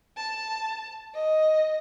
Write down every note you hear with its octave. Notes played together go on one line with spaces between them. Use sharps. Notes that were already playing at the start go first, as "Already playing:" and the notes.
A5
D#5